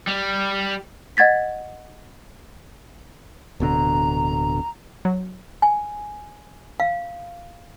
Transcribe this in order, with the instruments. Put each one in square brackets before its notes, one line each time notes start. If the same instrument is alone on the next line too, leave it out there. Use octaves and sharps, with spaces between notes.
[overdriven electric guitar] G3
[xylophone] D#5 F#5 G#6 A6 B6
[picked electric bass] D1 B2 D3 [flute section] A#5
[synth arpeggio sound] F#3
[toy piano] G#5
F5